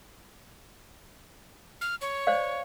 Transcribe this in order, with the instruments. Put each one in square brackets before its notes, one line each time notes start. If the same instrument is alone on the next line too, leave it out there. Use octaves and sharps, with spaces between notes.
[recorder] F6
C#5
[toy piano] C5 D5 F5